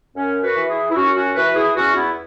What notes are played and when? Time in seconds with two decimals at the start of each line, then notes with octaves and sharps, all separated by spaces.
0.16 F#2 C#4
0.42 F#4 B4
0.55 E3
0.69 E4 G#4
0.91 E4
0.95 F#2 C#4 F#4
1.15 C#4 F#4
1.35 E3 F#4 B4
1.55 E4 G#4
1.76 E2 C#4 F#4
1.95 B3 E4